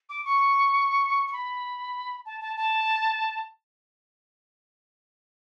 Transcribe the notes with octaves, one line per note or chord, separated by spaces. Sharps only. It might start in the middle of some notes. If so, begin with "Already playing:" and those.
D6
C#6
C#6
B5
A5
A5
A5